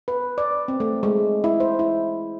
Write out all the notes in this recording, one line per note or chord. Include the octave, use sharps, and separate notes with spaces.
B4
D5
C4
A3
G#3
E4
C5
E4